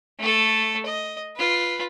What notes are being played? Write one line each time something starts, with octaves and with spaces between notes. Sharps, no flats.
A3 A4
D#5
F4 B4